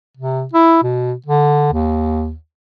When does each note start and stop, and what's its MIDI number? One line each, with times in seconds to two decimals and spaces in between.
0.17 0.45 48
0.53 0.81 64
0.83 1.13 47
1.26 1.70 50
1.72 2.34 39